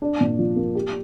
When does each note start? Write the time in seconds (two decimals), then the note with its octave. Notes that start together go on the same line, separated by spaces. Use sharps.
0.02 D4
0.21 A#2
0.39 F3
0.56 A#3
0.75 G4